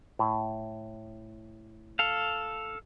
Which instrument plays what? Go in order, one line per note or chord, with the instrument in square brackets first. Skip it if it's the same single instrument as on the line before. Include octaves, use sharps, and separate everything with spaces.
[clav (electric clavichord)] A2
[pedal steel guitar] A4 F5